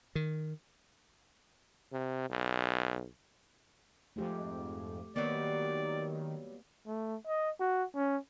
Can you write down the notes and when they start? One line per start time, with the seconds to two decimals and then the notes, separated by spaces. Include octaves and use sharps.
0.15 D#3
1.93 C3
2.30 B1
4.16 F2 G#2 A3 G4
5.16 D#3 F#3 G3 A#3 B3 D5
6.86 A3
7.26 D#5
7.60 F#4
7.95 C#4